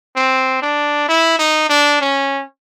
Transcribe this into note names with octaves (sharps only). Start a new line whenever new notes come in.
C4
D4
E4
D#4
D4
C#4